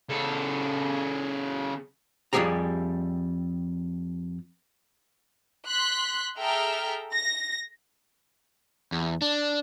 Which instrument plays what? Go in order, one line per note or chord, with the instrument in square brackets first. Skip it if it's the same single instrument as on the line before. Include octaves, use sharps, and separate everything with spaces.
[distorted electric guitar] C#3 A4
[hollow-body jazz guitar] F2 G3 E4 G4 G#4 A#5
[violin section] C6 F#6 B6
G#4 A4 E5 G5 A#5 F6
A#6
[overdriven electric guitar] E2
D4